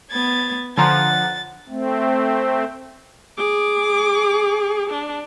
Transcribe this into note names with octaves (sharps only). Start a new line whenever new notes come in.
B3 G#6 A6
D3 F3 F#5 G#5 A#5 C6 A6
A3 C4
G#4 D6
D4